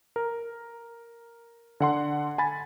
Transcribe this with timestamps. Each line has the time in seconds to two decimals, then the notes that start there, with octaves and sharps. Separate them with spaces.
0.16 A#4
1.80 D3 F#5 C6
2.38 G#5 B5 A6